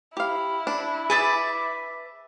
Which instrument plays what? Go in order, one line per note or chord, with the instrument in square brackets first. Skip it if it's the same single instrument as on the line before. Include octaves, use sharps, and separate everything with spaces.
[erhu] E4 [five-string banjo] G4 F5
[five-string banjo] D4
[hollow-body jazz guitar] G#4 [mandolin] B4 D5 E5